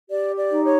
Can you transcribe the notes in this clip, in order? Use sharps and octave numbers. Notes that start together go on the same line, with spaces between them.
G4 D5
D5
D#4
C#5